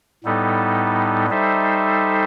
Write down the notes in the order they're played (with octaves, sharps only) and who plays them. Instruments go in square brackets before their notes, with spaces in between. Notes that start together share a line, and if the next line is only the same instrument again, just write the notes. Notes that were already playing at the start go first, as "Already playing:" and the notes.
[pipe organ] A2 G3 B3 D#4 A4
G3 D#4 A4 C5 E5